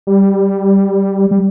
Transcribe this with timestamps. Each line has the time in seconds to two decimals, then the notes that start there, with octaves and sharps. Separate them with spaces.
0.07 G3
1.31 G3